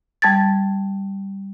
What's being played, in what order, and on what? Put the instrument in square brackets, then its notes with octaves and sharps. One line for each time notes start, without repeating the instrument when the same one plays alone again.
[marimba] G3 A5 G#6 A6